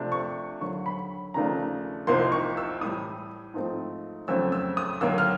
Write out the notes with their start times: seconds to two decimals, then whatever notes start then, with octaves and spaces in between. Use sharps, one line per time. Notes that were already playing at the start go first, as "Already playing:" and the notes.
Already playing: C3 F3 A3 D4
0.12 C#6
0.61 D#2 D3 F#3 C#6
0.86 B5
1.34 D#2 C#3 F3 A3 D4 A#5
2.07 C2 C3 F3 A#3 D#4 C6
2.32 C#6
2.57 E6
2.81 A2 E3 G3 D#6
3.54 G#2 F3 A3 C4
4.28 F2 C#3 F#3 A3 C4 E6
4.52 E6
4.77 D#6
5.01 D#2 D3 F#3 A#3 E6
5.18 F6